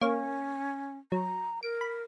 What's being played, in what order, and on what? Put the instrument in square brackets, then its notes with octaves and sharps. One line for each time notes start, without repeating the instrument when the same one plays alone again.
[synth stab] A#3 C#5 [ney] C#4
[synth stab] F#3 [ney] A#5
[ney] A#4 [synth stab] D7
[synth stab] B5